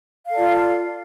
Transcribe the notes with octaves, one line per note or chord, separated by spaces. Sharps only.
F4 A4 D5 F5